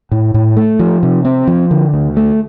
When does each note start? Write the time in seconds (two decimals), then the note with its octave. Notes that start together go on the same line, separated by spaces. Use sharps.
0.12 A2
0.34 A2
0.57 A3
0.79 F3
1.03 C3
1.25 C4
1.47 F3
1.71 D3
1.94 D2
2.17 A3